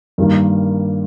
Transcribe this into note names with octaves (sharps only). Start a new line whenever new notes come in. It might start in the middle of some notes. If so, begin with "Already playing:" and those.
G2 D#3 G3 A#3